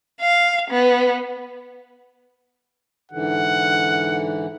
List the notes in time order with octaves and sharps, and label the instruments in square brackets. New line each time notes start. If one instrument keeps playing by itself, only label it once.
[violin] F5
B3
[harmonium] G#2 D3 E3 [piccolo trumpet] F#5